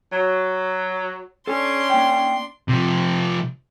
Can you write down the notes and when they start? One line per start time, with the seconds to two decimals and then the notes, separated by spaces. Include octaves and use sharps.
0.13 F#3
1.47 C#4 D4 A4 C6
1.90 A#3 G5
2.69 C3 F3